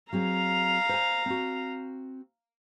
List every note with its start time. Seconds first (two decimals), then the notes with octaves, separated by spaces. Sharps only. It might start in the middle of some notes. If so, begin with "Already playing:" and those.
0.13 F#3 C4 G#4 F5 A#5
0.89 C5 G#5
1.26 C4 F#4